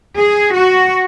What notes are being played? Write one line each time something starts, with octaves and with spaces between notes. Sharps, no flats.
G#4
F#4